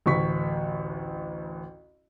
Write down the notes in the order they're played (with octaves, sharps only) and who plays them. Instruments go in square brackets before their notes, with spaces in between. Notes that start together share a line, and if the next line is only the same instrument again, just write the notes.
[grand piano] A1 D2 C#6 B6